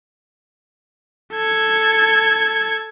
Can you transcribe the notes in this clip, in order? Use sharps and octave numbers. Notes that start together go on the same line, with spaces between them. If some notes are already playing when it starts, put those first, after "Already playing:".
A4 G#6